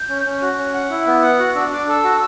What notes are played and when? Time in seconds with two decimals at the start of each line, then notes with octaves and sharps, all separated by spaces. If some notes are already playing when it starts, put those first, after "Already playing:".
Already playing: G6
0.09 C#4
0.25 C#4
0.42 F#4 F#6
0.58 C#4
0.74 F#5
0.90 E4
1.07 B3
1.23 F#5
1.38 F#4 F#6
1.55 D4 E6
1.72 D4 D6
1.88 A4 E6
2.04 F#4